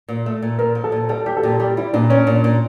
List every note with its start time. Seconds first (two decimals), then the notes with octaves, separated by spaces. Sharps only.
0.08 A#2
0.26 A3
0.42 A#2
0.58 A#2 A#4
0.75 F3
0.84 A4
0.92 A#2
1.09 G3 A4
1.26 G3 G4
1.37 A4
1.43 A#2 G4
1.60 G3 G4
1.77 G3 E4
1.93 A#2 D4
2.10 C#4 D4
2.27 A#2
2.44 A#2